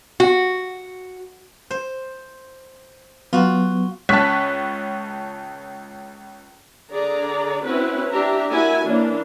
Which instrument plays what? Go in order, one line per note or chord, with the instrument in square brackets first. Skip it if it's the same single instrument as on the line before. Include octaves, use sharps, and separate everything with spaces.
[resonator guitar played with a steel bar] F#4
[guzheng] C5
[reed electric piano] F#3 B3 [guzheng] F4 F#4
[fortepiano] C#2 C#4 A5 [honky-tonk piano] C#6 F#6 B6
[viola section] D3 G#4 D5 A#5
C4 C#4 E4 F#4 B4
D4 G4 E5 A#5
E4 F#4 A#4 E5 G#5
E3 A#3 C#4 D4